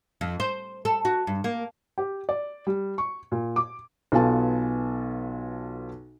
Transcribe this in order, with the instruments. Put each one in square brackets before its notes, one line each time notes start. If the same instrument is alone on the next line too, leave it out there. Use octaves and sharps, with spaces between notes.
[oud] F2
C5
A4
F#4
G2
A#3
[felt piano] G4
D5
G3
C#6
A#2
D6
B1 B3 F4 A4 G#5 A5